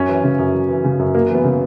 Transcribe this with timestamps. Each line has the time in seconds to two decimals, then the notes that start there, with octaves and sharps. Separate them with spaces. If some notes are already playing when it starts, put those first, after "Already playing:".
Already playing: F#2 C#4
0.09 E3
0.24 C#3
0.39 F#2
0.54 F#2
0.69 E3
0.84 C#3
0.99 F#2
1.14 F#2 A#3
1.30 E3
1.35 B3
1.45 C#3